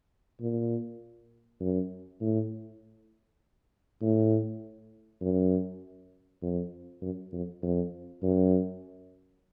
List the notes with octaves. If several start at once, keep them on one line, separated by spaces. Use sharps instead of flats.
A#2
F#2
A2
A2
F#2
F2
F#2
F2
F2
F#2